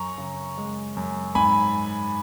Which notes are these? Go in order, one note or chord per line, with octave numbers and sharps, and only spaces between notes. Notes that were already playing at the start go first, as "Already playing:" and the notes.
Already playing: F#2 A#5 C#6
C#3
G#3
F#2
G#2 G#5 B5